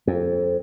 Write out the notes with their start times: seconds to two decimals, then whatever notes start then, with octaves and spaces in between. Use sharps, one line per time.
0.07 F2